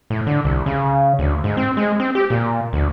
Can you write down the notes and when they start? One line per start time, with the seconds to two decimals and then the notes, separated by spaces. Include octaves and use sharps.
0.10 A2
0.27 D3
0.45 C2
0.66 C#3
1.19 D2
1.44 G#2
1.57 C4
1.77 G#3
2.00 C4
2.15 G4
2.30 A#2
2.73 D2